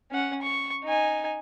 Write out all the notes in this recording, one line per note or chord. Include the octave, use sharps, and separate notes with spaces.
C#4 F#5
C#6
D#4 G#5